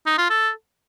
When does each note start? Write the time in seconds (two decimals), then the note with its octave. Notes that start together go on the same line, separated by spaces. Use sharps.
0.06 D#4
0.18 F4
0.30 A4